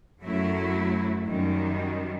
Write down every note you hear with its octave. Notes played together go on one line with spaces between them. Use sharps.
F#2 F#3 A3 E4
F#2 D#3 G3